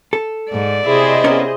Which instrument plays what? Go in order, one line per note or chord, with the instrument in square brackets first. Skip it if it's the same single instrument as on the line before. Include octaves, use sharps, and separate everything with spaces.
[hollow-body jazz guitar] A4
[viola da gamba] G#2 [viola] D5
[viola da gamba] C3 E4 [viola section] G#4 C5 D#5
[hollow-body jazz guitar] B3 C#4 A#4